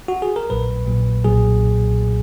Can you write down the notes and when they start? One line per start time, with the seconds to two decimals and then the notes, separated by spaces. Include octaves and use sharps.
0.08 F#4
0.22 G#4
0.36 A#4
0.50 A#1 A#2 F#3 B4
0.87 A#1 A#2 F#3
1.24 B1 A#2 F#3 G#4